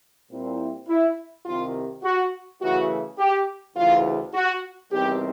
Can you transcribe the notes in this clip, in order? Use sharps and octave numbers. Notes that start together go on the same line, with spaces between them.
A#2 G3 C4 E4
E4
C2 C3 D#3 F4
F#4
F#2 C#3 E3 A3 F#4
G4
D2 C#3 E3 F4
F#4
E2 C3 D#3 G3 C4 G4